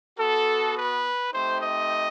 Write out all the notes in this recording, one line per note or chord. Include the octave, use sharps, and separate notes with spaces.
B3 F#4 A4
B4
A3 C4 D#4 G4 C5
D#5